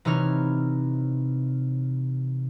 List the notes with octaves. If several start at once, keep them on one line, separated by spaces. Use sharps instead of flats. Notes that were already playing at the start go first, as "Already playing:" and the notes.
C3 E3 D#4 C#5 F6